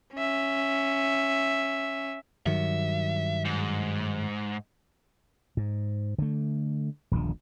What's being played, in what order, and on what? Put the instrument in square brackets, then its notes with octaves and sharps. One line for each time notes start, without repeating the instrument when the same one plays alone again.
[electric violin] C#4 E5
[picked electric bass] G2 D#3 F#3 [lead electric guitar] E5
[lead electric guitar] G#2
[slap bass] G#2
D3 A3
D#1 A#1 D3